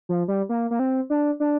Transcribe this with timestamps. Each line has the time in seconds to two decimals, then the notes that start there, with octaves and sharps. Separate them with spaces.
0.09 F3
0.28 G3
0.49 A#3
0.71 A#3
0.79 C4
1.10 D4
1.40 D4